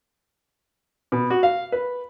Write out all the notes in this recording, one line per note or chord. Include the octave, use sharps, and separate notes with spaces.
B2
F#4
F5
B4